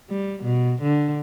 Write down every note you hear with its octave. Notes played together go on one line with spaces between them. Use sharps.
G3
B2
D3